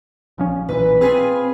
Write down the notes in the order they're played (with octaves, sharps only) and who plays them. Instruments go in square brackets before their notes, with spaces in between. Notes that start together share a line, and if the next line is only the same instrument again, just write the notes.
[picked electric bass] A#1 F3 C#4
[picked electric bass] B1 A#2 E3 [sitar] B4
[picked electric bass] C4 [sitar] F4 G#4 B4